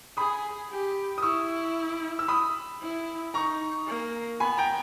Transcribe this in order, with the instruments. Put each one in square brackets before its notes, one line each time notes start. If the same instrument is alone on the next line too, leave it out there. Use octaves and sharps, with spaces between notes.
[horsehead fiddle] G#4 [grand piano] B5 D#6
[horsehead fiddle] G4
[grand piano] D#6
[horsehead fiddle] E4 [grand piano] C#6 E6
[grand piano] E6
B5 D#6
[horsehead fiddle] E4
[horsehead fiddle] D#4 [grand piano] A#5 C#6
[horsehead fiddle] A#3
[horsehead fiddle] B3 [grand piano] G#5 B5
[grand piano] G5 A#5